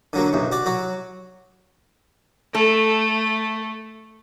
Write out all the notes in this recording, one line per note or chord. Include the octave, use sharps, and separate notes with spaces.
D3 F#3 A#3
B1 F#2
F#4 D5
F#3 F#4
A3 A4